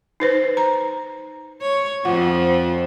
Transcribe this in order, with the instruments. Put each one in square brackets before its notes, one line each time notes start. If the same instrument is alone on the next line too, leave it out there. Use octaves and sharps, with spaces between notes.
[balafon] D#4 B4 C5
A#5
[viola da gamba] C#5
[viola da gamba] F2 F3 [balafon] F4 F#5